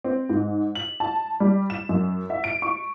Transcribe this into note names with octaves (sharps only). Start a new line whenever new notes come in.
C4
G#2
F#7
A5
G3
E7
F#2
E5
D7
C#6